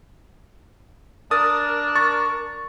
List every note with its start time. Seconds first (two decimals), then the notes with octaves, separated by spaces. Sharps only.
1.31 D4 A#4 D#6 A6
1.96 C#6 A6